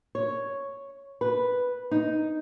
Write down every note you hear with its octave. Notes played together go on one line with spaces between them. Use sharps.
C#5
B4
D#4